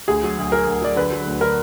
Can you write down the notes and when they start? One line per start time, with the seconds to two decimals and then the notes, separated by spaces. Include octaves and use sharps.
0.08 D2 G#4
0.23 F#3
0.38 D2
0.52 F#3 A#4
0.67 D2
0.81 F#3 D5
0.96 D3 B4
1.12 F#3
1.26 D2
1.41 D3 A#4